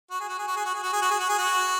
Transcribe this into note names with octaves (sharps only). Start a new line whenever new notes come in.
F#4
G#4
F#4
G#4
F#4
G#4
F#4
G#4
F#4
G#4
F#4
G#4
F#4
G#4
F#4